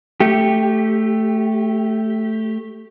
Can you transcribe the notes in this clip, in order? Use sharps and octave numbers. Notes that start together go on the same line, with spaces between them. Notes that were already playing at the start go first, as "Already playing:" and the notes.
A3 G4